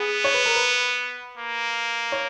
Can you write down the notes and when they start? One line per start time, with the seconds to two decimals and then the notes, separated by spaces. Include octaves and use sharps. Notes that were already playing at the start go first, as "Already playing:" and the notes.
Already playing: B3 G#4
0.24 C#5
0.34 B4
0.46 A#4
0.56 B4
1.37 A#3
2.12 C#5